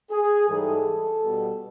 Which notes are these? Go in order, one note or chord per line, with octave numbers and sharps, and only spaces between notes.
G#4
G#2 E3 G3 A4
B2 G3